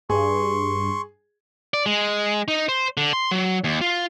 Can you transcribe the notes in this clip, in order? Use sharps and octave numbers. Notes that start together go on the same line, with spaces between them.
G2 G#4 C6 C#6
D5
G#3
D#4
C5
D3
C6
F#3
D#2
F4